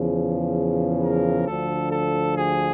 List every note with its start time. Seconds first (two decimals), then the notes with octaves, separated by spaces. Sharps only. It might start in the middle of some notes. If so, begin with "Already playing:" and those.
Already playing: E2 C#3 F3
1.03 A#4
1.47 D2 D3 F3 A4
1.92 A4
2.37 G#4